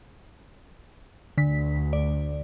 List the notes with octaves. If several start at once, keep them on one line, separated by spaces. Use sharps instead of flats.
D2 D3 B6
D5